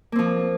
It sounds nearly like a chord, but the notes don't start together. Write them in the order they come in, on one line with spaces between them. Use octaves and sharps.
A#3 C4 F3